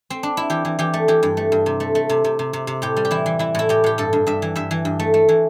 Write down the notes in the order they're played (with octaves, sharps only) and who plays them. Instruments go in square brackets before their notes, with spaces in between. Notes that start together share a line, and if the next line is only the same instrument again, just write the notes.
[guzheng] C4
D4
E4
E3 G4
E3
E3 G4
A3
E3 G4
G2
A3
G2
C3
A3
A3
C3
C3
C3
C3
C3
A2 G4
G3
G4
E3 E4
E3
E3 E4
A2 E4
A2 G4
A2 G4
G2 A4
G2
G2 E5
E3
G2 E5
E3
G2
A3
A3
E3